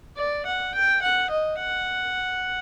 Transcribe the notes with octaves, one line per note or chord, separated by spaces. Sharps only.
D5
F#5
G5
F#5
D#5
F#5